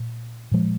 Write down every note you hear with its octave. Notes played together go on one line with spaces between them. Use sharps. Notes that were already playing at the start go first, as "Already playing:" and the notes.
Already playing: A#2
A#2 F3 G#3